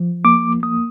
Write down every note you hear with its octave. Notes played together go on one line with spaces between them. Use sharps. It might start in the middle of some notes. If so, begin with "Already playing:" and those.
Already playing: F3
A#3 D6
A#3 D#6